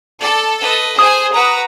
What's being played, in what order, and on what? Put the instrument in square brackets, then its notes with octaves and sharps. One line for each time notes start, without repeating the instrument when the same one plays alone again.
[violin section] A4 [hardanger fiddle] D5
[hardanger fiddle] B4 D#5
[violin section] G#4 [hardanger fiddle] C5 G#5 [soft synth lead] D#6
[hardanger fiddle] F#4 B4 [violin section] A#5